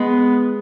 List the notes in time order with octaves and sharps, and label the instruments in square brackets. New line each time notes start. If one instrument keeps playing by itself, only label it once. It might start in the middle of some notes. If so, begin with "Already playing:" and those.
Already playing: [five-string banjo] G#3 [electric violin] B3